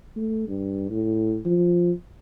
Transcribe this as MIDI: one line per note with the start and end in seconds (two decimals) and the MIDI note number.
0.16 0.47 57
0.48 0.85 43
0.90 1.38 45
1.45 1.91 53